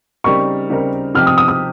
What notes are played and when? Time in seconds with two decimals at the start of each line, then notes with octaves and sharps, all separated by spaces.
0.24 C#3 G3 C4 D#4 A#4 C#6
0.70 C#3 G3 C4 D#4 A#4
1.15 C3 F3 C4 D#4 G4 F6
1.27 D#6
1.38 D#6
1.48 D#6